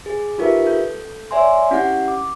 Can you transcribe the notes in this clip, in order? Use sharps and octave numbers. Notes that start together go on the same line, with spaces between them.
G#4
D#4 F4 G4 A#4 B4 E5
A4 G6
C#5 D5 E5 G#5 C6
C#4 E4 G4 F#5
D6